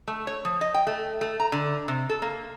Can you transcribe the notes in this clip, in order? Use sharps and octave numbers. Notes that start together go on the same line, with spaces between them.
A3
C#5
F3
D#5
G5
A3
A3
A#5
D3
C3
A4
A#3